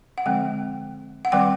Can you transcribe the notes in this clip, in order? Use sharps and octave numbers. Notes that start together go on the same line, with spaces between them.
F#5
D3 F3 G#3 C4 G5
F#5
D#3 G3 C4 G5